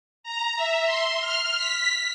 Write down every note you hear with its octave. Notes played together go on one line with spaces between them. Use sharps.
A#5
E5
C6
F6
B6